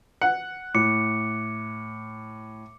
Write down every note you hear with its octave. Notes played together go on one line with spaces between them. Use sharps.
F#5
A2 D6 C#7